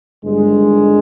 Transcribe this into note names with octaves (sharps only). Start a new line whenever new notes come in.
G1 G2 D#3 G#3